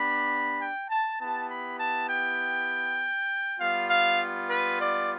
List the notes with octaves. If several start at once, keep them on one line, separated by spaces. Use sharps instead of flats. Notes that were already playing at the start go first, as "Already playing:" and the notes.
Already playing: B3 D4 G4 B5
G5
A5
B3 E4 G4 A5
B5
A5
G5
G3 B3 F4 F5
F5
B4
D5